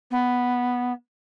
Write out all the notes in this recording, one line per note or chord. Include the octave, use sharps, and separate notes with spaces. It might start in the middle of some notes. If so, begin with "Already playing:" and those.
B3